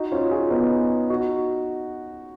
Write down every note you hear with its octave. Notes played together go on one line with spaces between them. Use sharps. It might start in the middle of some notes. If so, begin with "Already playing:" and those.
Already playing: D#4 F#4
C#4 F4
F4 G#4
B3 D#4
D#4 F#4